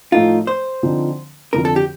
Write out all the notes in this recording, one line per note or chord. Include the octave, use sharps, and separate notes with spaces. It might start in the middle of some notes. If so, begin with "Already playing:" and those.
A2 F3 A3 D#4 F4
C5
D3 F3 C4 D#4
F2 D3 F3 A#4
A4
G4